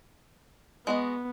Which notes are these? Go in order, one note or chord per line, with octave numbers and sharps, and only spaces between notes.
G#3 B3 F#4 D#5